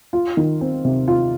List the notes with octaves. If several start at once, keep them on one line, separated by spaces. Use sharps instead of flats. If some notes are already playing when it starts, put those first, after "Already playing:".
F4
D#3
C4
C3
F4